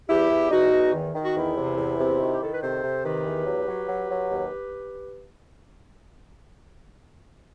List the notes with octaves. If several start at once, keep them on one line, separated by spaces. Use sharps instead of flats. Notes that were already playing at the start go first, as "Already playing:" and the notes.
E2 E4 G4
E2
E2 D#4 F#4
E2
D#3
D#3
F#4
E2 E4
C3
E2
C3
D#3 F#4
G4
D#3 A4
B4
C3 A4 C5
C3
D#3 G4 B4
E2
F#3
F#3
F#3
F#3
D#2